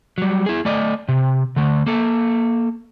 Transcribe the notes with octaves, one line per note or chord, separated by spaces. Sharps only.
F#3 G3
E4 G#4
A3 D5 D#5
C3
D3 A3
A#3 A4